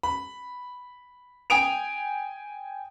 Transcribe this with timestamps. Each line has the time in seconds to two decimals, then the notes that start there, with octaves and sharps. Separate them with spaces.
0.03 B5
1.50 G5 G#5 D#6 D7 F7